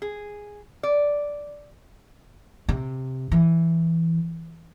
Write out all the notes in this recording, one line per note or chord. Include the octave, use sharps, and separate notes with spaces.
G#4
D5
C3
E3